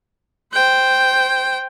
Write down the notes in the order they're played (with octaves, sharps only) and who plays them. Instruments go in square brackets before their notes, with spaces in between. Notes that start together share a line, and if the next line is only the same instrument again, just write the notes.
[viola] C5 G5